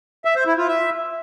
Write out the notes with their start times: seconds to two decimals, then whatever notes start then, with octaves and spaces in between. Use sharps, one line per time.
0.25 E5
0.36 C5
0.47 E4
0.57 F4
0.68 E5